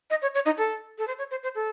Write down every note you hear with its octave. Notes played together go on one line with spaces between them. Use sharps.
D#5
C#5
C#5
D#4
A4
A4
C5
C#5
C5
C5
A4